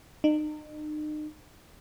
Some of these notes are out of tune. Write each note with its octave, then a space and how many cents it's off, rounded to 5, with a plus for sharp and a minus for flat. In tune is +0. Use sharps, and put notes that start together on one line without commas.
D#4 -40